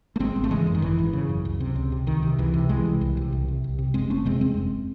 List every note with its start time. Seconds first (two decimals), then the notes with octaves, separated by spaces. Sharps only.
0.16 A3
0.20 G#1 G#3 C4
0.36 G#1
0.44 A3
0.51 C#3 E3 G#3
0.67 F#2
0.75 D#3
0.82 G#1 E3
0.98 G#1
1.13 C#3
1.29 F#2
1.45 C#2
1.60 C3
1.76 C#2
1.92 C3
2.07 C#2 D#3
2.23 C3
2.38 C#2 E3
2.54 C3
2.69 C2 E3 G#3
2.85 C3
3.01 C2
3.17 C3
3.32 C2
3.48 C3
3.64 C2
3.79 C3
3.94 F#1 G#3 C4
4.10 F#1 A3 C#4
4.25 C3 G#3 C4
4.41 E2 G#3 C4
4.57 F#1